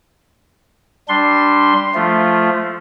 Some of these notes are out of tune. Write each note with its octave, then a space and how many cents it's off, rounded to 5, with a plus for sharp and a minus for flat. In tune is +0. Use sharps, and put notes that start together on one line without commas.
G3 +0 D4 +0 C6 +0
F3 +0 A3 +0 F4 -10